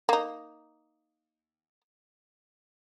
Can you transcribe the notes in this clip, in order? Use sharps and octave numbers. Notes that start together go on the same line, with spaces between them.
A#3 D#4